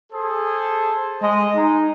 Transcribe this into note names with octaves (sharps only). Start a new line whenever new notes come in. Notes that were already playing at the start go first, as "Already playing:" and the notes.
G#4 A4 C5
G#3 D#5
G#3 D#4